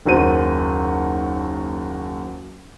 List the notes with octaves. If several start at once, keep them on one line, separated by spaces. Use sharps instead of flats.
F#1 D#2 F#3 C5 D#7